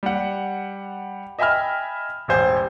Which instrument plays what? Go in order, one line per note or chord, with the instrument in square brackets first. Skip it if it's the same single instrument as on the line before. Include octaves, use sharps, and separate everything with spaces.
[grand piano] G3 F#5
D#5 E5 G5 G#5 B5 F6
E1 A1 G4 C5 G#5 G6